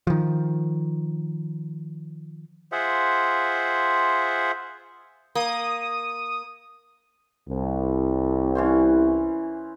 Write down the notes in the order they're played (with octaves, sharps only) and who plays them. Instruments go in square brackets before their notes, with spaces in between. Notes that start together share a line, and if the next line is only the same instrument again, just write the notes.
[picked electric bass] D#3 F3
[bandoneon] F4 G#4 C5 E5 F#5
[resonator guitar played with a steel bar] A#3 [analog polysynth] D#6
[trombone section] C2
[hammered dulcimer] E3 C#4 C5